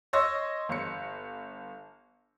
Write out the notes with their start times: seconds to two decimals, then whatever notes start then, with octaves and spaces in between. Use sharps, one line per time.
0.13 C#5 D#5 C6 C#6 E6 A#6
0.69 G1 C#7